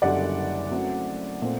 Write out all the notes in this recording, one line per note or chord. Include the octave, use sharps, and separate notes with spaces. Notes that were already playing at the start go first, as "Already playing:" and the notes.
F#1 F#2 D3 G3 D5 F#5
F#2 F#3 A3 C4
A#2 A3 C4